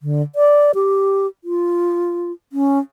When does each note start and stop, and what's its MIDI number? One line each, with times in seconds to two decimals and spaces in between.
0.01 0.22 50
0.35 0.72 74
0.75 1.27 67
1.44 2.32 65
2.52 2.79 61